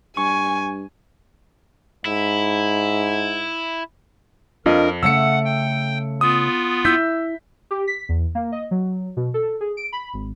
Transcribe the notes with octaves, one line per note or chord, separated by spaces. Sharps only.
G2 G#5 C#6
G#2 E4
F2 D4 F4 A#4 D#5
C#3 A3 E5 F#5 E6 C#7
G5
B3 F4 D#6
E4 E6 G6 B6
G4
B6
E2
A#3
D#5
F#3
B2
A4
G#4
D7
B5
G#1